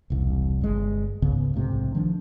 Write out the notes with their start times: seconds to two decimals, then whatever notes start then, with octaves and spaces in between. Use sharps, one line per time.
0.10 E1 C2 C3
0.61 G1 G#3
1.22 C#2 G#2 C#3 B3
1.55 A#1 G#2 C3 A3
1.95 D#3 F3 D4